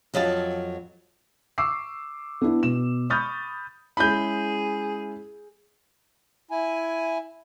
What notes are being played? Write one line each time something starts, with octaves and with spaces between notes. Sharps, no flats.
F2 F#3 D#5 F5 A5
C#6 D6 E6 C7
B3 D4 E4
B2 E7
B5 C#6 D#6 F6 G6 A6
G#3 C#4 E4 G#4 B5 G6
E4 G#5